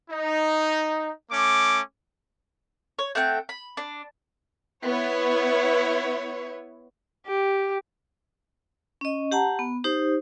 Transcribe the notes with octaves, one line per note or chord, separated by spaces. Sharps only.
D#4
A3 C#4 D6
C#5
A3 C4 F#5 G5
B5
D4
B3 E4 C#5
G4
C#4 D#5
G4 F#5 A5 A#5
B3
D#4 G4 C5